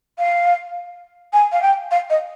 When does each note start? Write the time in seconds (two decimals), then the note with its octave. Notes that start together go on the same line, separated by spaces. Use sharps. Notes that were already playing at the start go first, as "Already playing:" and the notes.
0.19 F5
1.33 G#5
1.52 F5
1.62 G5
1.91 F5
2.10 D#5